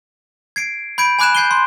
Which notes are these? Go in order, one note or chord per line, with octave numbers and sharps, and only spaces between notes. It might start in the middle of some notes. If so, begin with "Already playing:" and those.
G#6 C7 D7
B5 G6 G#6 D7
G#5 B5 D6 F#6 G#6 E7
G6 G#6 C7 D#7 G7
C6